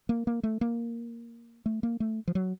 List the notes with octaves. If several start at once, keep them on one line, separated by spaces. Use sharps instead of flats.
A#3
A#3
A3
A#3
A3
A#3
A3
F3
F#3